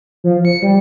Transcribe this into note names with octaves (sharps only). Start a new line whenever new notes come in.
F3
C#7
G3